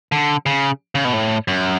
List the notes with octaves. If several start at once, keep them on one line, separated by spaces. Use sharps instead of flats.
D3
C#3
C#3
B2
A2
F#2